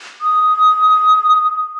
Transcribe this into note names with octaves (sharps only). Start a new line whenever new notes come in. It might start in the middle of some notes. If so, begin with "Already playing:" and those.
D#6